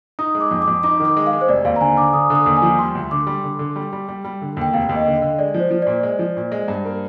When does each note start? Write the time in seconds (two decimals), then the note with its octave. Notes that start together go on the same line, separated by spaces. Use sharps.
0.19 D#4 D#6
0.35 G#3
0.40 D6
0.51 F2
0.62 D6
0.68 F2
0.83 D#4 D6
1.00 D#3
1.05 D6
1.17 G#3
1.26 F5
1.33 G#3
1.41 C5
1.48 F1 D5
1.65 D#2 F5
1.76 A#5
1.80 D3 G#5
1.97 D3 D6
2.13 D3 D#6
2.30 D3
2.35 D#6
2.46 D#2
2.57 G#5
2.62 F3
2.79 G3 C6
2.95 D2
3.11 D3 D6
3.27 G3
3.44 D3
3.59 D3
3.76 G3
3.93 G3
4.09 G3
4.24 G3
4.42 D3
4.57 D#2 G5
4.73 F1 F5
4.89 D#2
4.95 D#5
5.07 D3
5.22 D3
5.39 G#3 D5
5.54 F3
5.60 C5
5.71 F3
5.82 A#2 D5
6.03 G#3
6.19 F3
6.36 A#2
6.52 G#3
6.68 G2
6.85 A#3